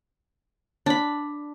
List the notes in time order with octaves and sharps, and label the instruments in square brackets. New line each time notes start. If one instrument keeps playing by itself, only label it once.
[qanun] D4 B5